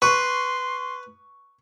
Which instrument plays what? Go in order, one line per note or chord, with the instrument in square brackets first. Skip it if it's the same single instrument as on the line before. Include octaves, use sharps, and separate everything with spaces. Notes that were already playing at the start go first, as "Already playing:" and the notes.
[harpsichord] B4 [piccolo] C6 [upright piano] C#6